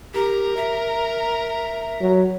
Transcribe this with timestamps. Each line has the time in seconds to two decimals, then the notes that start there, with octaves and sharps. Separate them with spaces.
0.14 G4 A#4 A#5
0.57 E5
2.01 F#3